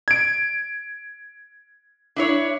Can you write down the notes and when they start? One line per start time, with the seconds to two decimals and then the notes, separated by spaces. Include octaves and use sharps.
0.08 G#6 D7
2.16 D4 E4 C#5